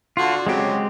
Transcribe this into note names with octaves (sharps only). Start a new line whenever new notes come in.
D3 F4 F#4
C#3 F#3 G#3 C4 G4